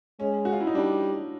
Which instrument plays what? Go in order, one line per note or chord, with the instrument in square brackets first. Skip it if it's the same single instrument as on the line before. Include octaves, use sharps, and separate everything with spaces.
[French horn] G#3 [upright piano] C#4
[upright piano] F#4
F4
E4
D#4
[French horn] G3 [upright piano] D4